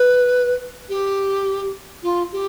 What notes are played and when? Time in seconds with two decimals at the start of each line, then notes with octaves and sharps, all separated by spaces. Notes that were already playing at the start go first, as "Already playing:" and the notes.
Already playing: B4
0.89 G4
2.02 F4
2.32 G4